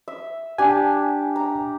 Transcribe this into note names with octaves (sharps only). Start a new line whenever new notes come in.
E5
D4 G4 G#5
A#5